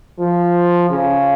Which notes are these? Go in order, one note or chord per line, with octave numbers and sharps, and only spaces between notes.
F3
C#3